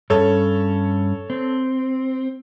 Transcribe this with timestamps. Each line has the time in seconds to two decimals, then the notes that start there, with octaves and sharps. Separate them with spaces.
0.10 G2 C#4 A4 C#5
1.30 C4